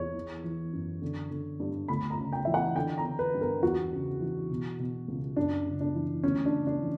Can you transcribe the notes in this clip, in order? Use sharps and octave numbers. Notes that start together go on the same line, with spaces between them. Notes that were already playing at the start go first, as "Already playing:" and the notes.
Already playing: E2 C#5
E3
E3
F#2
D3
D3
G2
D2 B5
A#5
C#3
G5
E3 E5
F#5
D3 G5
A#5
D3
B4
G2
A#4
E2 F#4
C#3
E3
B2
B2
C#2
F#2 D4
C#3
D4
E3
D2 C#4
D4
C#3
D4
E3